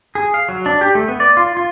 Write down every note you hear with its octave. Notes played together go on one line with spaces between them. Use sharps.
G#4
F5
F#3
D4
G4
A3
B3
D5
F4
F4